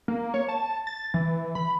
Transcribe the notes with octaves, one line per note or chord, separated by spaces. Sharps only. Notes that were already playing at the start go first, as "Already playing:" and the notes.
A#3
C#5
A5
A6
E3
B5